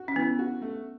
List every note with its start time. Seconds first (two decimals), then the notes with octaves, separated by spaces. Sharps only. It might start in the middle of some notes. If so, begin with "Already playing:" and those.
Already playing: F#4
0.08 C#4
0.16 E3 B3
0.39 F#4
0.62 A3